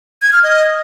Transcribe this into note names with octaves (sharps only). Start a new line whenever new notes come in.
G#6
F6
D#5